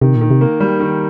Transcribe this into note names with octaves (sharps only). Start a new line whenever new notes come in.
C3 D#3
A#2
D#3
C3
A#3
G3
D#3